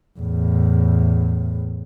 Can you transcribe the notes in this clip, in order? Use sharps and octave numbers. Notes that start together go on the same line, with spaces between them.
E2 A2